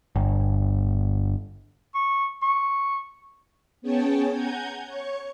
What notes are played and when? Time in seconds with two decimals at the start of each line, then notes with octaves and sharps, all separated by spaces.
0.16 G1
1.95 C#6
2.42 C#6
3.82 B3 C#4 G#4 C#5 G5 A5
4.30 F#5 G#5 A#5 G6 G#6
4.87 C#5 C#6